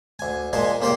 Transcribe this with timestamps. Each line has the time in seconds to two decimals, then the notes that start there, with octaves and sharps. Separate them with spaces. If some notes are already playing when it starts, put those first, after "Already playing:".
0.19 D2 G#5
0.53 A#2 G#3 C5 G#5 A5
0.81 C#2 A#3 G4 C5 D5 F5